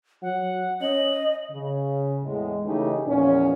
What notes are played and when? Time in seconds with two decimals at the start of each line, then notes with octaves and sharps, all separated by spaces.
0.22 F#3 F#5
0.81 C#4 D#5 F#7
1.51 C#3
2.23 E2 A2 G#3
2.65 C#3 E3 A3 D#4 G4
3.06 E2 A#2 F3 C#4